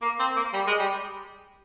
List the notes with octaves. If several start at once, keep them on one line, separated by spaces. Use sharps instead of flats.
A#3
C4
A#3
G3
G#3
G3